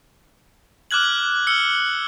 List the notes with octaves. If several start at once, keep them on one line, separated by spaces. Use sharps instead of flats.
D6 F6 F#6 G#6 F#7
E6 F6 C#7 G7